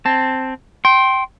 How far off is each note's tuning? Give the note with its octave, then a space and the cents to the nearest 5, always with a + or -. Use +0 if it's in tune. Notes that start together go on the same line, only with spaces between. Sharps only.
C4 +0 A5 +0
G5 -15 C6 +15